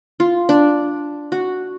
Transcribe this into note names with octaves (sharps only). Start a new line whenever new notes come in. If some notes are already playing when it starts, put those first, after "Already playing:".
F4
D4
F#4